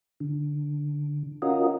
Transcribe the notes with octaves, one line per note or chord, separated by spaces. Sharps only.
D3
C#4 F4 F#4 A#4 D#5